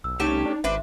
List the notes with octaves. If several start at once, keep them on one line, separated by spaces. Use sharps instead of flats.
B1 E6
C2 A3 C#4 D#4 G4 E7
D4
G#1 D4 B4 C5 E5